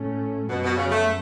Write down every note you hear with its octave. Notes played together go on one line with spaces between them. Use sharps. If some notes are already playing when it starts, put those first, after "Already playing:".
Already playing: A2 A3 C#4
F#2 B2 F#3 B3
B2
C#3
A3